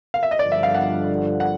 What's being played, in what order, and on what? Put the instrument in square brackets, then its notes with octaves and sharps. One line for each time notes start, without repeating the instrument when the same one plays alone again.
[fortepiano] F5
E5
D#5
[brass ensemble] G2 D3 F3 [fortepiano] D5
[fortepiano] E5
F5
F#5
F#5